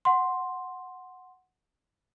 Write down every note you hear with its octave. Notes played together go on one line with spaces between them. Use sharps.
F#5 C6